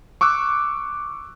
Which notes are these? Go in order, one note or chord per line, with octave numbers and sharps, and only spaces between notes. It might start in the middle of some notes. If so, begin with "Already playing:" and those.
C#6 D6 E6 F#6